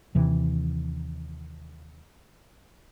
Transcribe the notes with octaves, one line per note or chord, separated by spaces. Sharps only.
D#2 C3 E3